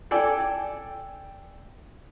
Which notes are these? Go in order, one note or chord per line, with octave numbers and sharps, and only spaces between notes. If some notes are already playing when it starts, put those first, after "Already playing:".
A4 D5 G5 G#5